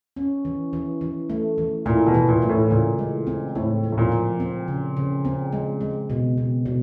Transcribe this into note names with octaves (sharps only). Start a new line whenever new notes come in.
C#4
E3
E3
E3
A3
E3
A#2 E4
B2
E3
A#2
A3
A2
A#2 C#3
G#3
C4
A2 C4
F3
A2
A#2
F3
C4
C#3
C#3
C4
G#3
G#3
B2
B2
B2